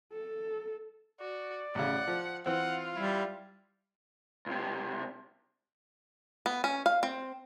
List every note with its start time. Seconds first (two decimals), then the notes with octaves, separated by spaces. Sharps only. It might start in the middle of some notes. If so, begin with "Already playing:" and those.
0.12 A4
1.21 F#4 D5
1.75 A1 C#3 F#5
2.08 F3
2.46 E3 C4 F4 F#5
2.96 G3 E4
4.46 C#2 C3
6.46 B3
6.64 C#4
6.86 F5
7.03 C4